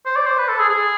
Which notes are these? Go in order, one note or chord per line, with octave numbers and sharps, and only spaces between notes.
C5
D5
C5
B4
A4
G#4
G#4